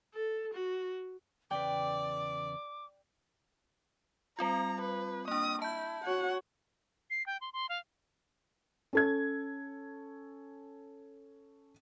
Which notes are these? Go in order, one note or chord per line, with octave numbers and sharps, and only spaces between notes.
A4
F#4
E2 C#3 B4 D5 G5 D6
G3 C4 F4 A#5
B4
A#3 D4 D#6
E4 A5 G6
F#4 C#5 F#5
C7
G5
C6
C6
F5
C#4 A4 G#6